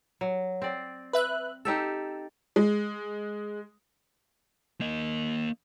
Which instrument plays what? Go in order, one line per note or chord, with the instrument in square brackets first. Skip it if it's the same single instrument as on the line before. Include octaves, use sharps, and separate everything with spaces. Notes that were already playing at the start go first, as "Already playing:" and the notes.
[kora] F#3
C4 D5
[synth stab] B4 E5 F#6
[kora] D#4 G4 A4 [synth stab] E6
[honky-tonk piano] G#3
[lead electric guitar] A#3 D#5